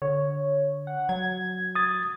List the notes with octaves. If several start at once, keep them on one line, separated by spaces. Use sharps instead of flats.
D3 C#5
F#5
F#3 G#6
D#6 A6